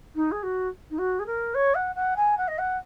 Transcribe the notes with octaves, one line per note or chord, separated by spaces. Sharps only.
D#4
G#4
F#4
D#4
F#4
G#4
A#4
C#5
F#5
F#5
G#5
F#5
D#5
F#5